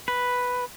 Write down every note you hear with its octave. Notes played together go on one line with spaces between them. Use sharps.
B4